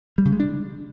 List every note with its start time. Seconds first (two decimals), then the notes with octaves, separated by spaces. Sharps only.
0.18 G3
0.25 C#3
0.32 G#3
0.40 D4